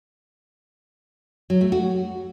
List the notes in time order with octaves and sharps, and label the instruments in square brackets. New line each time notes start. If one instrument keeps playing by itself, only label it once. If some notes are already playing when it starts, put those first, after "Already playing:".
[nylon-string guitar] F#3
A3
F#4